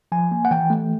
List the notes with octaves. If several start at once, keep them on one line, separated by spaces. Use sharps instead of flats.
F3 G#5
A#3
F#5
E3 G5
A3